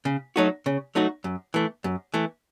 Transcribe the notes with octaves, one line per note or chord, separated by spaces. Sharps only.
C#3
F#3 A3 D#4 F#4
C#3
F#3 A3 D#4 F#4
F#2
E3 A3
F#2
E3 A3